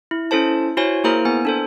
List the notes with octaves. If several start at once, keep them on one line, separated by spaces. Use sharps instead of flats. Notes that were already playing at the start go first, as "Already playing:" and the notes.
E4
C#4 E4 A4 C5 A5
E4 F#4 C5 C#5 G#5
A#3 E4 G#4 A#4 C5 A#5
B3 G#5
D4 A4 C5